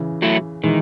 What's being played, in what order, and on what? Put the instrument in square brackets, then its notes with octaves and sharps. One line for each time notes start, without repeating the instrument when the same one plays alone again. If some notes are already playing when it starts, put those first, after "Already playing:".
Already playing: [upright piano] C#3 E3
[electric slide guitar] F#3 A3 E4
[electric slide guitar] D#3 [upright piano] E3 G#3